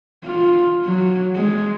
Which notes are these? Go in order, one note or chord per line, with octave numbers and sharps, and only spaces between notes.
F4
F#3
G#3